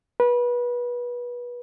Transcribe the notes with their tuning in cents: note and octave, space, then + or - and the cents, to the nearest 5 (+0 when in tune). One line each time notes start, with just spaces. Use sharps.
B4 -25